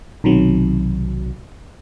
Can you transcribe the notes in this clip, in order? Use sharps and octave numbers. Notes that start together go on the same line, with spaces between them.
B1 C3 D#3 F#3